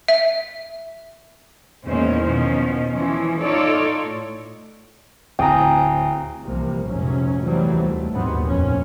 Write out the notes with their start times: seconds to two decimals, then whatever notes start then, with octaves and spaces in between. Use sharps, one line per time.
0.08 E5
1.86 E2 A#2 D#3 G#3 C#4 C5
2.24 B2 D#3 F3 C#4
2.90 E3 F3 C#4
3.42 D#4 F4 A4 C#5 D5
4.03 A2
5.39 D1 C4 G5 G#5 A#5 D#6
6.45 C2 C3 E3 F3 A#3
6.86 F1 A#1 G#2 F3 F#3 C#4
7.43 E3 F#3 G3 A3 C4
7.72 D#2 A3
8.13 A#1 D#2 G#2 F#3 B3 C4
8.45 F1 F2 A#2 C#4